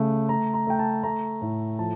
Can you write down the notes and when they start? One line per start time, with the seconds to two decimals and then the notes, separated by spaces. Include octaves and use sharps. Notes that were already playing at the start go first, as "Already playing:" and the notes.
Already playing: C#3 A3
0.29 A3 A#5
0.54 A#5
0.67 A3 G5
0.79 A5
1.03 A3 A#5
1.41 A2
1.79 F3 A5